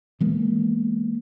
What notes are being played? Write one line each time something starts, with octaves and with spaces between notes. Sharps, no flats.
E3 G#3 A#3 B3